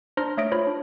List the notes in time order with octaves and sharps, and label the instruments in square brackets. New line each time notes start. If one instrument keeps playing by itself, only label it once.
[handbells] D4 C5 A#5 C6 F6 A#6
A3 C#5 E5 D#6 A#6 D7
F4 C5 C#5 B5 F6
D4